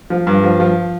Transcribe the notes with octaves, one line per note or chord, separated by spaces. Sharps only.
F3
G2
F3
F3